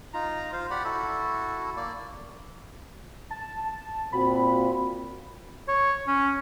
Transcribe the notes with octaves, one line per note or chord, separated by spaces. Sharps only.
D#4 F4 A#5
F4 C5 F5
G4 D5 F#5 B5
E4 F#4 A4
A#3 D5
A5
A#2 C4 F#4 B5
C#5
C#4